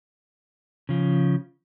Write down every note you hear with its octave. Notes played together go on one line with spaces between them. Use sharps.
C#3 F3